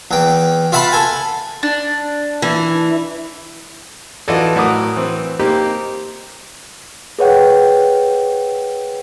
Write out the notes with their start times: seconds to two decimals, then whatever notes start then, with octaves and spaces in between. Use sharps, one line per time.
0.11 E2 G5
0.72 F4 E5 F#5 A5 B5 C6
0.92 A4 G#5
1.63 D4
2.42 E3
4.28 E3 F4 F#4 A4 D5 D#5
4.56 A2 F#4 A#4 D6 D#6
4.96 E3 C4
5.39 A#3 C4 D#4 G4
7.19 G#4 B4 C#5 F#5 G5